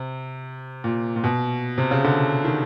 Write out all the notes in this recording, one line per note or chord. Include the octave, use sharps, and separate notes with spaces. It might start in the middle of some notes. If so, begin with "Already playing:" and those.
Already playing: C3
A#2
A#2
B2
C3
C#3
D3
D#3